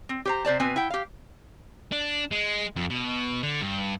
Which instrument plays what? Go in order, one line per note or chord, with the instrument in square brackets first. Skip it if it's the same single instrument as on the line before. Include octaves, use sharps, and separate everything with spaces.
[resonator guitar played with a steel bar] C4
G4 C5 A#5
C3 C5 D5 A5
B2 C4 B4 G#5
E4 F#5 G5
G4 F5
[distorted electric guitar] D4
G#3
F2
B2
D3
G2